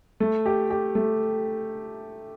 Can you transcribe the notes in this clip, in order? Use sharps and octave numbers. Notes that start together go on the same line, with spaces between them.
A3
G4
G4
A3